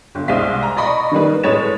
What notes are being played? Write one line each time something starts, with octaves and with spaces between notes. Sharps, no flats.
G1
C2 G#3 C5 F5 B6
A#5
D5 D#5 B5 C#6
D#3 G3 A#3 B4
A2 G#3 B4 C#5 A6 E7